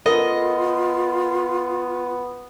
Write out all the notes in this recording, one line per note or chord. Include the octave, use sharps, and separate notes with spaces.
B3 F4 A4 A#4 D#5